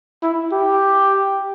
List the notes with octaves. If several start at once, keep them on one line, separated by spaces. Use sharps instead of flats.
E4
G4